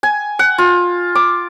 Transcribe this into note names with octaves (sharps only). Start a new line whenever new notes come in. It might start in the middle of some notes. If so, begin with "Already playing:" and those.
G#5
F#5
F4
D6